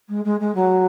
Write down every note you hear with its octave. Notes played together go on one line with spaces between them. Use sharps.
G#3
G#3
G#3
F#3